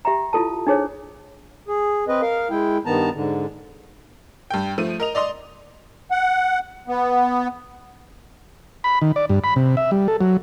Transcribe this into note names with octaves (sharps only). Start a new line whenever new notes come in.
G4 E5 G5 A#5
E4 F4 A4 A5
D4 D#4 G#4 C5 C#5
G#4
C4 B4 D#5
A#4 F5
G#3 E4 G5
G2 D#3 B3 A5 A#5
G#2 D3
G2 G5
F3 A3 D#7
A#4 D#5 F7
D5 D#5 C6 D#6
F#5
B3
B5
D#3
D5
G2
B5
C3
E5
G3
A4
F#3